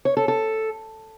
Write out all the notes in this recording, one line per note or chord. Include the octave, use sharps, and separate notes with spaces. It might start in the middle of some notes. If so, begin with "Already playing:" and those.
C#5
A4
A4